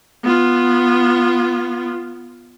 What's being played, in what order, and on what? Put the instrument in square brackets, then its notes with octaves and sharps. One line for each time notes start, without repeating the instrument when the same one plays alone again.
[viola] B3 F4